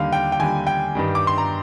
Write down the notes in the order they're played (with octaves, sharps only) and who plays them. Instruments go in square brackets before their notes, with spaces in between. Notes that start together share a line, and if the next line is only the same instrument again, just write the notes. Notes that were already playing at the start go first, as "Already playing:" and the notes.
Already playing: [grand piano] D#2 D3 G3 F5
G5
G5
D#2 D3 G3 G#5
G5
G2 D#3 G3
D6
C6
A#5